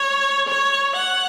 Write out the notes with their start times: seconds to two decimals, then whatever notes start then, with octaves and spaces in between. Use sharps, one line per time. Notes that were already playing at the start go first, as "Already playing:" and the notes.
Already playing: C#5
0.48 C#5
0.96 F#5